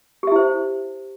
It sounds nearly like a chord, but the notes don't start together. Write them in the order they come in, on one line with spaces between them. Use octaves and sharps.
G4 E5 E4 C5